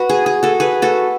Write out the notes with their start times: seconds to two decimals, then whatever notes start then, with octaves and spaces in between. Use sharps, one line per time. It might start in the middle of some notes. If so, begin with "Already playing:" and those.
Already playing: F#4 B4
0.09 G#4
0.26 G#4
0.43 F#4 A4
0.60 G#4 B4
0.82 F#4 A4